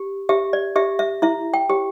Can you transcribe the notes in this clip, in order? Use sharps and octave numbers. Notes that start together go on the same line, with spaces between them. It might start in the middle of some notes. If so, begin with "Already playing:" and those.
Already playing: G4
G4 E5
D5
G4 E5
E5
E4 E5
G5
G4